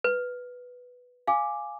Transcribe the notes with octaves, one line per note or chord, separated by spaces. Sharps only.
B4
F5 G#5 D6